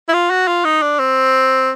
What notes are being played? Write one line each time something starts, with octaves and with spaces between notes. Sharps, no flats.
E4
F4
F#4
F4
D#4
D4
C4